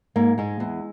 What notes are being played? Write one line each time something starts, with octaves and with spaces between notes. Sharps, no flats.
G#2 A#3
G#2 G#3
E2